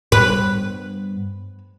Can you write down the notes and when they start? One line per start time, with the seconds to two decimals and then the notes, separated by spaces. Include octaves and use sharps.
0.12 G2 G3 B3 B4